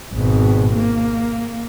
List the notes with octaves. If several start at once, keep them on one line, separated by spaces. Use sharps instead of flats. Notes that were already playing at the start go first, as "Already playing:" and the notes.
G#1 B2
A#3